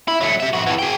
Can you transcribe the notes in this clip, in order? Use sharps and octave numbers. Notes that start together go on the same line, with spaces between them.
E4
F#3 A3
G4 E5
F2 F#4
F2 E3
G#4 G5